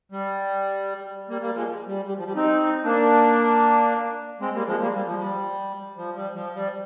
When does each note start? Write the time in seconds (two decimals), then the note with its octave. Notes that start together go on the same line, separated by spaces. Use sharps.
0.12 G3
1.30 G3 A#3
1.42 G3 A#3
1.55 F3 G#3
1.88 G3
2.07 G3
2.17 F3
2.26 G3
2.36 C4 D#4
2.84 A#3 D4
4.40 G#3 C4
4.54 G3 A#3
4.67 F3 G#3
4.80 G3 A#3
4.93 G3
5.06 F3
5.18 G3
5.97 F3
6.15 G3
6.35 F3
6.55 G3